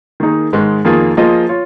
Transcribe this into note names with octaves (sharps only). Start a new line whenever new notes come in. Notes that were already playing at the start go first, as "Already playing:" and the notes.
D#3 A#3 D#4 G#4
G#2 D#3 G#3
F2 D#3 A#3 F4 G#4
F3 A#3 F4 G#4 D#5
F4 C#5